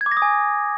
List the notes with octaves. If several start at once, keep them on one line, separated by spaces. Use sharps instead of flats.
G#6
D6
A#6
D#6
G#5